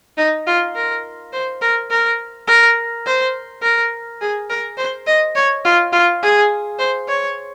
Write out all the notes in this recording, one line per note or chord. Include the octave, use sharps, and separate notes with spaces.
D#4
F4
A#4
C5
A#4
A#4
A#4
C5
A#4
G#4
A#4
C5
D#5
C#5
F4
F4
G#4
C5
C#5